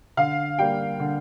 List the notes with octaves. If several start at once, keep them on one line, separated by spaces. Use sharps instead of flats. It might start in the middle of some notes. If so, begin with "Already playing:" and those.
D3 F5
G3 A#3 G5
D3